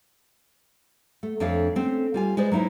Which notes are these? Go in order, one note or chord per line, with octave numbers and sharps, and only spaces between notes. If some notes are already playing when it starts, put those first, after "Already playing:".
A3
F2 D4 C#5 E5 F5
A3 C4 C#4
G3 F4 G#5
G#3 G#4 B4 C5 D5 D#5
F#3 A#3 D#4 E4 C5